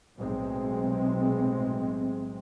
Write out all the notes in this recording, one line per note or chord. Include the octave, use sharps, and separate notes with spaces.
B1 A2 C3 G#3 C4